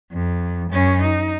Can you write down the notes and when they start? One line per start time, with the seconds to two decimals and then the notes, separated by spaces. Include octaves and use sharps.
0.12 F2
0.71 F#2 C#4
1.02 D#4